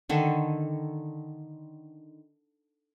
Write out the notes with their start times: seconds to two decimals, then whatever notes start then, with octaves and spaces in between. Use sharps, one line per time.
0.09 D3 D#3 A4